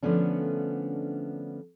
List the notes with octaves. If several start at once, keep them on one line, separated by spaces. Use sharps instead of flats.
D3 F3 A3 B3 C#4 D4